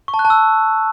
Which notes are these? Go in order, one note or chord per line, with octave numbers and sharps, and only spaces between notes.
C#6
A5
F#6
A5
E6